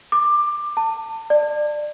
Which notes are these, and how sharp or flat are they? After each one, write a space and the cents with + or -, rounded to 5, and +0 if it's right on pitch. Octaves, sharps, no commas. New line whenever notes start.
D6 +15
A5 +25
D5 +25